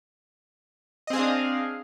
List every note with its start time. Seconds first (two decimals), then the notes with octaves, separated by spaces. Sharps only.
1.07 D#5
1.10 C4
1.13 G#4
1.16 F5
1.19 D4